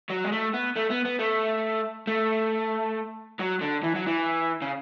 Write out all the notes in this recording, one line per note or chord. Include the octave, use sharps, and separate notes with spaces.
F#3
G#3
A3
B3
A3
B3
B3
A3
A3
F#3
D3
E3
F#3
E3
C#3